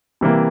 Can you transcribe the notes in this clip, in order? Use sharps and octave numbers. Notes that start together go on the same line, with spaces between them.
C3 E3 G3 A#3